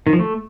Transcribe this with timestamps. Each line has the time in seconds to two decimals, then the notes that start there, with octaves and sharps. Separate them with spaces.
0.07 D#3
0.13 F3
0.19 A3